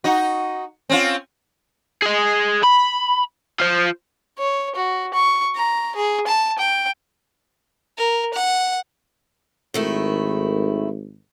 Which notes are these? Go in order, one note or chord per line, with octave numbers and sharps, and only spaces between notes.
D#4 F#4
C4 C#4 F4
G#4 D#5
B5
F4 C5
C#5
F#4
C#6
A#5
G#4
A5
G5
A#4
F#5
G#1 D#3 A3 E4